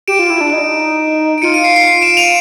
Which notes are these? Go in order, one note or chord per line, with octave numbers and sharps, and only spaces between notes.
G4 D7 E7
F4
E4
D4
D#4
D7
F4 C#7 D#7
C#7 D#7
C7 D7
C7
C7
D7 E7
D#7 F7